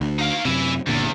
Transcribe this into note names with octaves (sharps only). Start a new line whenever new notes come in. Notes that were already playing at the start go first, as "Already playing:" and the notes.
D2
D#4 F5
F#2 C3 E4 G#5
F#1 E2 A#2 D3